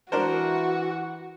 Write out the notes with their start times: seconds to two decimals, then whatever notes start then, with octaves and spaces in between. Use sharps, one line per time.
0.12 E3 D4 F#4 A#4 C5 F#5